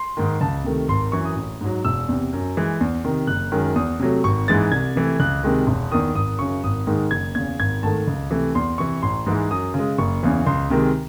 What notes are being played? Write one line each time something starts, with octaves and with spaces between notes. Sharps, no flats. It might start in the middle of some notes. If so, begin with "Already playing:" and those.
Already playing: C6
G#2 D#3
C#2 A5
C3 D#3 A3
G#1 C6
F#2 E3 C#6
D#6
A1
G#2 F#3
E1 E6
E2 C3
F#2
E3 G#3
E2
C3 D#3
F#1 F#6
F#2 D#3 G#3
E2 D#6
C3 F#3 A3
G#1 C#6
G#2 E3 G#3 A6
C2 G#6
C3 E3 A3
C#2 F#6
C3 D#3 G#3
E1
E2 D#3 D#6
G#1 D#6
F#2 C#3 C#6
G#1 D#6
G#2 D#3 G#3
F#1 G#6
E2 C#3 G#6
G#1 G#6
G#2 D#3 A3 A5
C#2
C3 E3 A3
E2 C6
C3 E3 C#6
A1 C6
G#2 E3 G#3
F#2 D#6
C#3 G#3
F#1 C#6
E2 C#3 E3
C#2 C6
C3 D#3 G#3